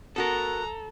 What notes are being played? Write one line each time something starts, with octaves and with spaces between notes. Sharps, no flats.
B3 F#4 A4 A#4 A#5